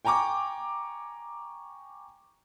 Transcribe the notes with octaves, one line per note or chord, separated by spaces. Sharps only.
G5 G#5 A#5 C#6 D6